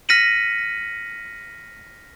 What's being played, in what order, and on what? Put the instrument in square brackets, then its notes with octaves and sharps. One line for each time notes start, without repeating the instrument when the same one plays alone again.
[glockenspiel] F6 A#6 B6 C#7 D#7 F#7